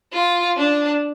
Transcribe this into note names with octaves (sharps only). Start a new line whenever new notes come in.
F4
D4